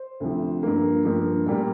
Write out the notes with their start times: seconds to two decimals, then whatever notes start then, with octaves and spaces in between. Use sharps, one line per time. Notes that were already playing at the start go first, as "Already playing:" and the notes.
Already playing: C5
0.20 D2 C3 F3
0.63 G2 F3 A#3
1.05 G2 F3 A#3
1.46 A#2 G3 A#3